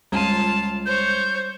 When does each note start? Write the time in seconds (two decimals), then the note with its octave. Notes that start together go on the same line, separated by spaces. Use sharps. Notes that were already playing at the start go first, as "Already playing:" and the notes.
0.12 C#2 G3 C#4 F4 A5 D#7
0.86 C5 C#5 G6